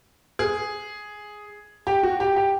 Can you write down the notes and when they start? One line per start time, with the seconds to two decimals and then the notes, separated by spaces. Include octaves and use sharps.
0.39 G#4
1.87 G4
2.03 F#4
2.20 G4
2.36 G4